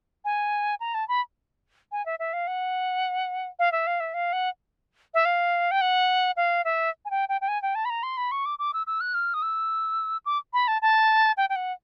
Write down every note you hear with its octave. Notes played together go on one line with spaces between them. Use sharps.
G#5
A#5
A5
B5
G#5
E5
E5
F5
F#5
F5
E5
F5
E5
F5
F#5
E5
F5
G5
F#5
F5
E5
G#5
G5
G5
G5
G#5
G5
A5
B5
A#5
C6
B5
C#6
D6
D6
E6
E6
F#6
F6
D#6
E6
D6
B5
A5
A5
G5
G5
F#5